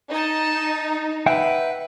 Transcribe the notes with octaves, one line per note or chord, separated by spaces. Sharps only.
D#4 D#5 A5
B4 E5 F#5 G5